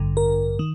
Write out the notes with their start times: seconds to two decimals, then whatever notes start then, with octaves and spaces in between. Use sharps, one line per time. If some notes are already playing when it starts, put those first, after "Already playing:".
Already playing: A1 G2 D3
0.17 A#4
0.59 D#3